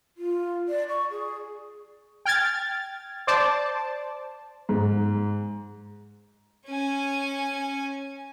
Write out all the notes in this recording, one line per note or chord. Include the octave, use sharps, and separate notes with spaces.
F4
D5
C#6
G#4
G5 F6 G#6 A6
C5 D5 A5
G#2
C#4 G#5